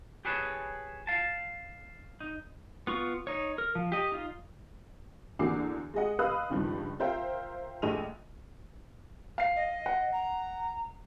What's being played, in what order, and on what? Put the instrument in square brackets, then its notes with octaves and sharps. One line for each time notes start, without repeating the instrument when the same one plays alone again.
[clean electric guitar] G4 G#4 B4 C#5 A5
F5 A5
D#4
[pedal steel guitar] B3 F4 C#6
D#4 C#5
A#4
F3
G4 D#5
D#4 F4
[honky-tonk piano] E2 D3 A#3 F#4 D6 C7
G#3 G#4 D#5 F#5
B4 D#5 F5 D#6 E6 F#6
C#2 G2 D#3 F3
F4 A#4 C5 E5 F5 G5
A#1 G#3 A3 D#5 D#7 F7
[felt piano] F5 C7
[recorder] D#5
[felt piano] F#5
[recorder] A#5